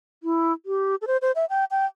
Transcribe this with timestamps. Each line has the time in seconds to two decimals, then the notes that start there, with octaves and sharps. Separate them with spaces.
0.23 E4
0.66 G4
1.02 A4
1.07 C5
1.22 C5
1.35 E5
1.50 G5
1.71 G5